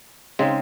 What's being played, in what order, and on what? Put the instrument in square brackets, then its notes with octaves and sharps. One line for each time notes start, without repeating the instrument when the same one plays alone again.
[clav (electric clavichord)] C#3 G#3 C4 D#4